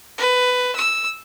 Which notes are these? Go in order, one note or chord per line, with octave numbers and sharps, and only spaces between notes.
B4
E6